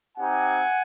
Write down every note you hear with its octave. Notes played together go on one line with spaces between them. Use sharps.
C4 D#4 G4 F#5 G#5